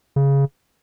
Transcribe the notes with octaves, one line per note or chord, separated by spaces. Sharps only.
C#3